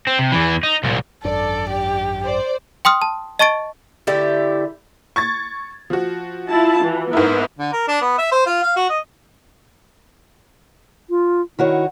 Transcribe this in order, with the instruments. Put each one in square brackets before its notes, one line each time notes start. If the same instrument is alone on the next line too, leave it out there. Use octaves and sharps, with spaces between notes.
[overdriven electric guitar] C4
C3
E2 E3
D#4
C2 A#2
[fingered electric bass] G#1 F#2 D4 [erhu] A4 [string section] D5
[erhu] G4
[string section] C5 D5
[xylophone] G5 C6 D#6 F6
A5
D#5 A5 C#6 A6 D7
[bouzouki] D3 A3 E4 G4
[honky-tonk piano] C#6 G#6 A6
F3 F#4
[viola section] E4 F4 A5
E3
[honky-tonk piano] G#2 E4 [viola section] B3 A#4
[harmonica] D3
A#4
D4
B3
E5
C5
F4
F5
F#4
D#5
[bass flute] F4
[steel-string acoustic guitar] D#3 F#4 C#5 [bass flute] E4